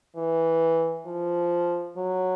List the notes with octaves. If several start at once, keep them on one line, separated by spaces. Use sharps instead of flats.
E3
F3
F#3